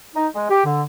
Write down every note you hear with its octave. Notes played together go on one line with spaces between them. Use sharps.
D#4
G#3
G4
D3